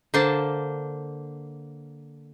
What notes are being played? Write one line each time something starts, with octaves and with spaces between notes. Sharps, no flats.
D3 A#3 C5 A5